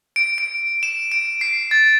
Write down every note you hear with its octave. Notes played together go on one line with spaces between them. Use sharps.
D7
D7
E7
D7
C7
A6